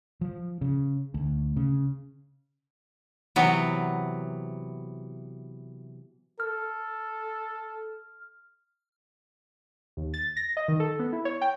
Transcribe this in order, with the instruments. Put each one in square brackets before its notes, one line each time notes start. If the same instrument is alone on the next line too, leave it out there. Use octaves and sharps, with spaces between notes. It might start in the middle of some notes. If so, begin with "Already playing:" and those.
[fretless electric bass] F3
C#3
D2
C#3
[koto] C3 E3 F#3 B3
[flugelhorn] A4 [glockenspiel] F6
[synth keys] D#2
A6
A#6
D#5
D#3
A4
B3
E4
C#5
G5